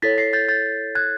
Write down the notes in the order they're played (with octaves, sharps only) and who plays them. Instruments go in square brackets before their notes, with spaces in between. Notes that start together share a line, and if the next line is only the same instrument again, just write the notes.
[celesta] E4 A4 C#5 A6 B6
A#6 C7
G6 A6
G6 A6
F#6 G#6